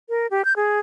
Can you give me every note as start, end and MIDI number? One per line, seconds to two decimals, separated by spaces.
0.09 0.27 70
0.31 0.45 67
0.45 0.53 91
0.56 0.80 68